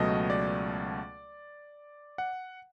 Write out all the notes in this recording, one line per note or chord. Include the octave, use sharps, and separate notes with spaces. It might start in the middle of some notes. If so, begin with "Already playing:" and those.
Already playing: C#2 B2 F#3 A3 D#5
D5
F#5